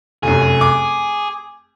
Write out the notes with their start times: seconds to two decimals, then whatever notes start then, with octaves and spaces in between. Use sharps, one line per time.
0.23 F1 F#2 G#4
0.61 D6